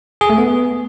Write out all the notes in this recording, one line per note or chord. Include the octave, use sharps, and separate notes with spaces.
G#4
A3
B3